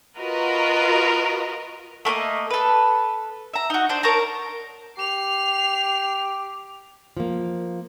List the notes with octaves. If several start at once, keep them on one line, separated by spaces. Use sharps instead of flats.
F4 F#4 A#4 B4 D#5
A3 A#3 C#5 D#5
A4 B4
E5 A#5
D#4 F#4
D4 C5
A#4 C#5 A5 A#5
G4 C7 F7
F3 A#3